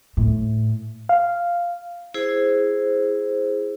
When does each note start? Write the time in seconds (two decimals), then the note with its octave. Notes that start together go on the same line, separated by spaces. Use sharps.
0.17 A2
1.09 F5
2.14 E4 G#4 C5